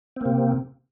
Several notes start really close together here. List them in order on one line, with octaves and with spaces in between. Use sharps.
C4 A#3 C3